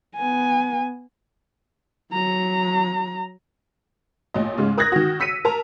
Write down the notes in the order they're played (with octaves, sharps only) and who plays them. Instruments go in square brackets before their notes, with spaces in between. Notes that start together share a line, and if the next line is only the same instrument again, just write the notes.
[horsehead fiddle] B3 G#5
F#3 A#5
[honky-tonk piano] A1 A#2 D#5
G#2 C#3 G#3
A#4 D#6 F#6 G#6 A#6
D#3 F#4
E6 B6 C#7 D#7
A#4 A5 A#5